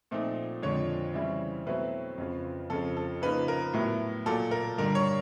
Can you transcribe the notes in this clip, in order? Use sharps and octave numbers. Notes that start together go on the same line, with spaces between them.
A#2 F3 A3 C4 D#4
F2 D3 F3 G#3 C#5
C#3 E3 G3 C4 E4
B2 F#3 A3 C4 E4 B4
F2 C#3 F3
F2 C#3 F3 A4
A4
C#3 F3 A#3 D#4 B4
A#4
A2 F#3 B3 E4
A#2 F#3 A#3 A4
A#4
G2 D3 G3 A#4
C#5